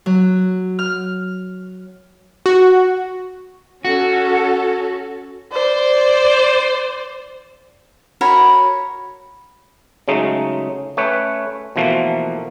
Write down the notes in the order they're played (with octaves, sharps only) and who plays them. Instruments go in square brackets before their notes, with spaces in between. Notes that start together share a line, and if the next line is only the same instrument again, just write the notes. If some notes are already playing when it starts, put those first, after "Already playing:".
[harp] F#3
F6
[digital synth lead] F#4
[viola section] C#4 A4 [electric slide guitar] F#4
[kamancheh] C5 D5
[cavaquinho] F#4 A#4 C#5 B5
[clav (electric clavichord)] C#3 F#3 G#3 A3 D#4
A3 C#4 B4 C#5 G5
B2 E3 F3 A3 A#3